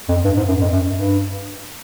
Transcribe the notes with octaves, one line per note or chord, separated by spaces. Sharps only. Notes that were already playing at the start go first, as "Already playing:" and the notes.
F2
G2
G#2
F#2
F2
F#2
G2